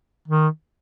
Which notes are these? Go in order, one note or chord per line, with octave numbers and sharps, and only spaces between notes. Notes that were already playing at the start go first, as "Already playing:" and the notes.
D#3